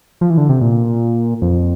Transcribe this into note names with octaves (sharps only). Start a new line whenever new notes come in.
F3
E3
D3
C3
A#2
F2